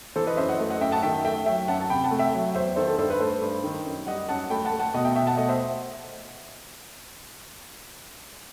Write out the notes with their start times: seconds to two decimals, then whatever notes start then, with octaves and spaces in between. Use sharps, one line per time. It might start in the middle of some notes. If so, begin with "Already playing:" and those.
0.16 E3 A4 C5
0.27 B4 D#5
0.37 F#2 C5 E5
0.49 D#5 F#5
0.60 A3
0.70 D#5 F#5
0.81 F#2 E5 G5
0.91 F#5 A5
1.03 D#3 E5 G5
1.24 A3 E5 G5
1.46 F#3 E5 G5
1.68 F#2 F#5 A5
1.81 A5
1.90 C3 G5 B5
2.04 F#5 A5
2.11 A3
2.19 E5 G5
2.34 F#3
2.54 E2 C5 E5
2.76 D#3 A4 C5
2.87 A4
2.98 G2 A4 C5
3.10 B4
3.20 A3 A4 C5
3.41 G2
3.64 D#3
3.86 F#2
4.07 G3 D#5 F#5
4.28 F#2 F#5 A5
4.50 A3 G5 B5
4.65 F#5 A5
4.72 A3
4.79 F#5 A5
4.94 B2 D#5 F#5
5.05 E5 G5
5.16 B2 E5 G5
5.27 F#5 A5
5.37 A3 D#5 F#5
5.49 C5 E5